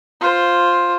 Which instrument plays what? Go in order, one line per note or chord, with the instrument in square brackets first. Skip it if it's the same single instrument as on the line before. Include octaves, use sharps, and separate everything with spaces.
[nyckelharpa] F4 C5